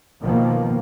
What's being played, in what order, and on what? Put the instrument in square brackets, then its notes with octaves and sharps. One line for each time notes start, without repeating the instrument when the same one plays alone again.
[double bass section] B2 D#3 F3 A#3